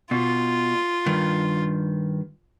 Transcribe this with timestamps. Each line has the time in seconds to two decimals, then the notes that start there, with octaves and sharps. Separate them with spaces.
0.11 B2 F4
1.06 G2 D#3